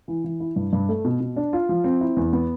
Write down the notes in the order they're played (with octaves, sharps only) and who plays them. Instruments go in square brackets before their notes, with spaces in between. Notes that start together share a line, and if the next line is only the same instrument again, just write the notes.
[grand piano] E3
E3
E4
G2
G2
A3
B2
B2
D4
F4
F3
C4
E4
E2
B3